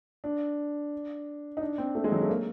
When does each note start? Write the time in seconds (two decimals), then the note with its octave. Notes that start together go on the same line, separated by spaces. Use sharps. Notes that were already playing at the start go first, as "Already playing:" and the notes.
0.24 D4
1.57 D#4
1.61 D4
1.78 C4
1.95 A3
2.04 G#3
2.12 F#3
2.21 A3
2.29 A#3